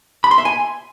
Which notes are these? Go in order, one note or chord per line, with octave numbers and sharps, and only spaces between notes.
B5
C6
E5
G#5